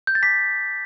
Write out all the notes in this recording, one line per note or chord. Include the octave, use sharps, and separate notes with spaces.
G6
A6
A5 D6 G6 B6